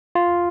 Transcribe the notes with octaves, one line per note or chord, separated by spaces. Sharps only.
F4